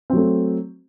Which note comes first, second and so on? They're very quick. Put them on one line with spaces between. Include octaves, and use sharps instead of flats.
C4 F#3 A3